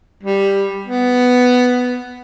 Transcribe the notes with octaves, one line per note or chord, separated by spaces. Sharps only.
G3
B3